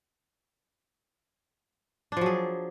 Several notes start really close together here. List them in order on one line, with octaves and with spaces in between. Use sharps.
D4 F3 F#3 G#4